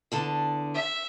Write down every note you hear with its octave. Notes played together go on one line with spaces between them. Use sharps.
E2 D3 A5
E5